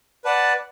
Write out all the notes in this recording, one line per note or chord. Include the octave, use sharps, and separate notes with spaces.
B4 D5 F#5 A5